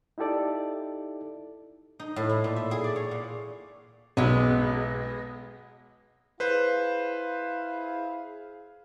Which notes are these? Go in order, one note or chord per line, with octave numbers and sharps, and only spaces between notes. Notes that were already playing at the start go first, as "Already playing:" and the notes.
D#4 E4 G4 A4 D5
D#4
A2
E4
A#2
E5
G#4
D5
C#5
A#2
B1 G#3 B3
E4 G#4 B4 C5 F5